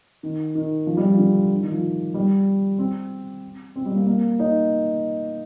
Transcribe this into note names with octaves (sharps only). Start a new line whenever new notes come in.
D#3
D#3
F3
G3
F3
D3
D#3
F3
G3
C4
C4
G3
A#3
A#3
D#4